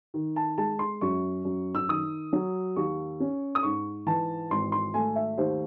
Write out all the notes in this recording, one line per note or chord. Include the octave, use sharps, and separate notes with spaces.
D#3
A5
G#3 A5
C6
F#2 C#6
F#2
E6
D#3 D#6
F#3
D#2 C#6
C#4
D#6
G#2 C#6
E3 A5
G#1 C6
C6
A3 G#5
E5
D#2 C5